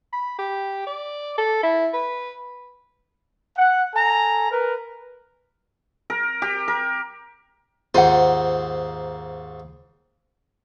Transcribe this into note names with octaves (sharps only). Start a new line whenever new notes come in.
B5
G4
D5
A4
E4
B4
F#5
A4 G#5 A#5
A#4 B4
A#4
G4
A#4
D#2 G#2 F4 C5 F#5